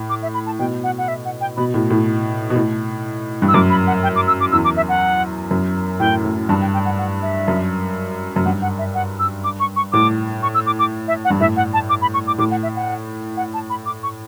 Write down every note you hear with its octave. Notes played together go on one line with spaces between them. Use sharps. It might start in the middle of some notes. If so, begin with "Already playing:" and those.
Already playing: A2
D6
E5
B5
A5
B2 G5
F#5
F#5
E5
F#5
G5
B2 B5
A2
A2
B2
A2
G2
E6
F#2 D6
B5
F#5
G5
D6
E6
D6
E2 E6
D6
E5
F#5
F#2
A2 G5
A2
G2 A5
G5
G5
F#5
F#5
E5
F#2
F#2
G2 F#5
F#5
E5
F#5
E6
D6
C#6
C#6
A2 D6
C#6
E6
D6
D6
E5
F#5
G2
A2 E5
F#5
A5
D6
B5
C#6
D6
A2 D6
F#5
E5
F#5
F#5
A5
B5
D6
C#6